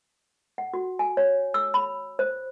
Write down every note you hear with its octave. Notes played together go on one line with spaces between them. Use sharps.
F#5
F#4
G#5
C#5
E6
B5
C5